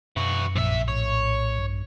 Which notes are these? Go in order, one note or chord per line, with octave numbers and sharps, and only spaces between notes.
F#2 E3 F#4
A#1 C3 E5
A2 C#5
G2